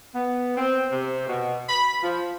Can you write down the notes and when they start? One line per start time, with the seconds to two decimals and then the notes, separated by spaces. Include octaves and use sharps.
0.14 B3
0.57 C4
0.91 C3
1.28 B2
1.69 B5
2.03 F3